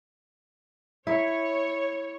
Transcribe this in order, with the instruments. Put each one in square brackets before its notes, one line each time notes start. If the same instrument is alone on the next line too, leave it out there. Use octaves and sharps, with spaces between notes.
[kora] E4 [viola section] C#5